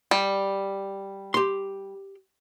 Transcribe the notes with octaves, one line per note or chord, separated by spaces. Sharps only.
G3
G4 C6